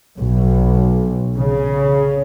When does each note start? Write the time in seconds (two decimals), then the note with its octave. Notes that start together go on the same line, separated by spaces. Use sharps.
0.18 B1
1.36 C#3